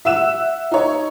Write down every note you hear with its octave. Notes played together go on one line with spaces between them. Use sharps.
E5 F#5 E6 E7
D#4 C#5